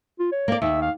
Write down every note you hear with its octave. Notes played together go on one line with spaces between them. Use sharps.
F4
C#5
A#3 D5
D#2 E5
F5